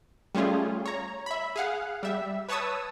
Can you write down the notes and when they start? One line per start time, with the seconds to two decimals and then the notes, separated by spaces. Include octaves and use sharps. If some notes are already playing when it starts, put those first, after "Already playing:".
0.35 G3 A3 C#4 F4 G#4
0.86 C#5 A#5
1.26 E5 B5
1.56 G#4 F5 F#5
2.03 G3 E5
2.49 B4 C#5 A5 C#6 D#6 E6